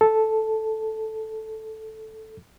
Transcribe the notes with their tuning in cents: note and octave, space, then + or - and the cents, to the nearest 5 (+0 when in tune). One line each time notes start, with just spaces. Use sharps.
A4 -5